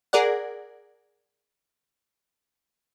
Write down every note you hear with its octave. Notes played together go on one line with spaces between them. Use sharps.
G#4 A#4 D5 F#5